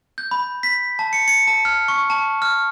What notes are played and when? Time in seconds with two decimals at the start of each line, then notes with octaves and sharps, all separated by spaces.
0.18 G6
0.31 B5
0.63 B6
0.99 A5
1.13 C#7
1.28 C#7
1.47 A5
1.65 F6
1.88 C#6
2.10 A5
2.42 F6